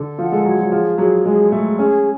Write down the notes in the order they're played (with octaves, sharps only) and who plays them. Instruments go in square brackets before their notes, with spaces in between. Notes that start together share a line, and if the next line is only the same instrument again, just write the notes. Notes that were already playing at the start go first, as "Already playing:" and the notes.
Already playing: [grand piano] D3 [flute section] A4
[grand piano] F3 [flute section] F#5
[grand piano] G#3
[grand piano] F#3 [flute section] C#5
[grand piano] F#3
[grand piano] F3 [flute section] G#4
[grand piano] F#3 [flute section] G#4
[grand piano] G#3 [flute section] G#4
[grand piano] A3 [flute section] G#4
[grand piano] C#4 [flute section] G#4